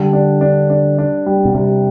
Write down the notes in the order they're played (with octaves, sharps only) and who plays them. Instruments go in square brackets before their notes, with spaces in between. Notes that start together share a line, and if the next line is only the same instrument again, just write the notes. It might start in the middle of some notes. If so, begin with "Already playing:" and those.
Already playing: [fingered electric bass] D3 [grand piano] G3
[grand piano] D4
D4
D4
D4
G3
[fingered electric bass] B2
[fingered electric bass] C3 [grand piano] G3